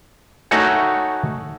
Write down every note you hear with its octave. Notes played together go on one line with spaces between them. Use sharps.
A3 D#4 F#4 C#5 F#5 G#5